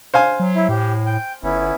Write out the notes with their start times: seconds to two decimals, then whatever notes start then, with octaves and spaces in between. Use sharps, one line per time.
0.14 C5 F5 G#5
0.40 F#3
0.56 E4
0.69 A2 G4
1.06 G5
1.43 G1 B3 C#4 E4